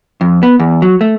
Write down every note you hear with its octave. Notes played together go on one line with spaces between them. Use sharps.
F2
B3
E2
F#3
A3